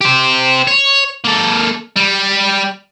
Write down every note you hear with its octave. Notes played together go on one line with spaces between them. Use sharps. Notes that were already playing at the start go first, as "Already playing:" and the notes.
G4 C5
C#5
A#3 A4
G3